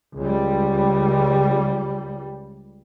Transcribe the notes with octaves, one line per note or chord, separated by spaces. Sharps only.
C#2 G3